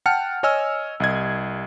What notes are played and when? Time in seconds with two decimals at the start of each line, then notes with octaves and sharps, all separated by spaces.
0.06 F#5 G5 A5 F6 C#7
0.43 C#5 D#5 G#5 E6 F6
1.00 C2 D#5 G#6